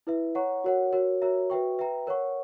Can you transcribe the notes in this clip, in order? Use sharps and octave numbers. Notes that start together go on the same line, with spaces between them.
E4 B4 E5
C#5 F#5 A#5 C#6
F#4 A#4 C#5 F#5
F#4 A#4 C#5
F#4 A#4 C#5 E5 A#5
F#4 B4 E5 G5 C#6
B4 E5 G5 A#5
A#4 C#5 F#5 C#6